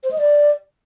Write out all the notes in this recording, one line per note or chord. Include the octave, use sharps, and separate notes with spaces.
C5
D#5
D5